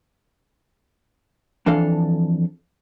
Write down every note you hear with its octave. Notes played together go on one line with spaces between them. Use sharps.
F2 E3 D4 A4 F5